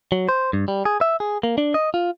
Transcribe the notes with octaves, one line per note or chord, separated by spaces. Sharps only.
F#3
C5
G2
G3
G#4
E5
G#4
A#3
D4
D#5
F4